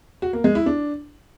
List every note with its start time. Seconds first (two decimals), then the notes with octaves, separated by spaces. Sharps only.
0.22 F#4
0.33 A#3
0.44 G#3
0.55 E4
0.66 D4